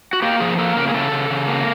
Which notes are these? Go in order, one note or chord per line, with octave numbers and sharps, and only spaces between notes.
F#4
A#3 G4
F3 G#4
A#3 A4
C#3 A#4
G#4
C#3 A4
C#3
C#3
A#3